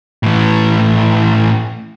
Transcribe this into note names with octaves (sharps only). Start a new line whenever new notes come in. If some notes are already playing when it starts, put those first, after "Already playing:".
A2 E3